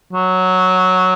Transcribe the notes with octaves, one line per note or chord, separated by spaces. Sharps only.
F#3